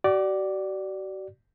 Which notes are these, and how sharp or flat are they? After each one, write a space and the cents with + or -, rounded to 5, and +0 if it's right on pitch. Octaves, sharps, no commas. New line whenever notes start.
F#4 +45 D5 +0